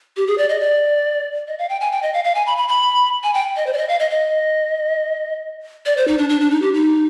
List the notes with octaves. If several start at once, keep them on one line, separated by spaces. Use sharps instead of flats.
G4
G#4
D5
D#5
D5
D#5
F5
G5
G#5
G5
D#5
F5
F5
G#5
B5
B5
B5
G#5
G5
D#5
C5
D5
D#5
F5
D#5
D#5
D5
C5
D#4
D4
D4
D4
D#4
G4
D#4